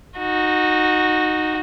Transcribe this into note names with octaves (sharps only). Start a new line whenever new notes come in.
D#4 F#4